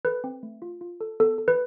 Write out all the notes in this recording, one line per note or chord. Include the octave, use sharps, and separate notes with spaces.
A4 B4
C4
A3
F4
F4
A4
B3 A4
A4
B4